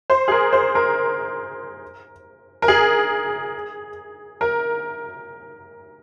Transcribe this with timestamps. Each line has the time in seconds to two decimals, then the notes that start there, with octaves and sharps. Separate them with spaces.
0.10 C5
0.28 G#4
0.32 A#4
0.53 C5
0.75 A#4
2.62 A#4
2.68 G#4
4.41 A#4